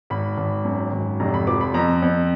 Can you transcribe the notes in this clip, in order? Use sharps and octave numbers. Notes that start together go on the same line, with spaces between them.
G#1 B5
G#1
F#2
G#1
F1 A#5
B5
F3 D6
B5
F2 A#5
F2